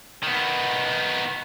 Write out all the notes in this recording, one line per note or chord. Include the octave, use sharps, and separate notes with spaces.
D#3 B3